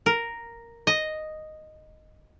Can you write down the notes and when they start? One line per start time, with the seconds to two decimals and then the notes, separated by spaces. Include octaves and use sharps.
0.06 A#4
0.87 D#5